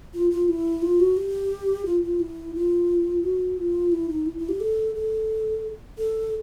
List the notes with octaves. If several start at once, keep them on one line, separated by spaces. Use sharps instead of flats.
F4
F4
E4
F4
F#4
G4
F4
F4
E4
F4
F#4
F4
E4
D#4
E4
E4
G4
A4
A4
A4